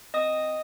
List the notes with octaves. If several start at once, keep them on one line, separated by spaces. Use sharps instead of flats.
C4 D#5 D#6